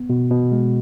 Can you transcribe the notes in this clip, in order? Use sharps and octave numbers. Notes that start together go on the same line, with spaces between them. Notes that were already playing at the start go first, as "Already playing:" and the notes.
Already playing: B3
B2
B2
G#3